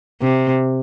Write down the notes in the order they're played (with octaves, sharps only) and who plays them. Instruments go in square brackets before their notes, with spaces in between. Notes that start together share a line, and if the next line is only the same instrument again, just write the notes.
[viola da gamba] C3